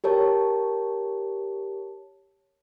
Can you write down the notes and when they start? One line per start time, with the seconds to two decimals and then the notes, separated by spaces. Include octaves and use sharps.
0.04 G4 A#4 C#5 A5